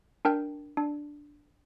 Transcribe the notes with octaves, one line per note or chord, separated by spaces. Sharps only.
D4 A#4 G5
D4